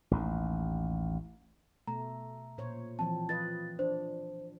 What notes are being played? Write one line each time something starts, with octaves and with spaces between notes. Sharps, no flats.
A1 D#2
B2 A3 A#5
A#2 C5 C#5
E3 F3 C4 A5
F4 B4 D#5 A6
D4 C5